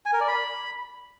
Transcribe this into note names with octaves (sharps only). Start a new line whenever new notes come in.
G#5
A#4
D5
B5